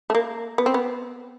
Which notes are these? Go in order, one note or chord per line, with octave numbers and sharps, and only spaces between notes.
A3
A#3
B3
C4
B3